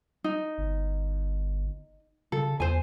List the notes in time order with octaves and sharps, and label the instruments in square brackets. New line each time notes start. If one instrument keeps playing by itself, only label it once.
[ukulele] D#4
[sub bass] G1
[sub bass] C#3 [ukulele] A4
[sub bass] E2 [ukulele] C5 G#5